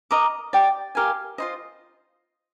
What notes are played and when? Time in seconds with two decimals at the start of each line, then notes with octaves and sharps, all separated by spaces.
0.11 A#4 D#5 A#5 D6
0.53 G4 D5 G5
0.95 G4 A#4 F5 G#5
1.38 F4 C5 D#5